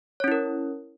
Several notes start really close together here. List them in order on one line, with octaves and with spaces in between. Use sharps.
C#5 C#4 E4 A#4